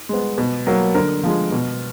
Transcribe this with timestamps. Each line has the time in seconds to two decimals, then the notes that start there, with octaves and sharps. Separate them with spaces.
0.09 G#3 B3
0.38 B2
0.67 F#3 A#3
0.95 D3 A#4
1.23 F3 G#3
1.52 B2